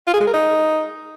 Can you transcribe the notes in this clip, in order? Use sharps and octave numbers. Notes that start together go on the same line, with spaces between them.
F4
G#4
G#3
A#4
D#4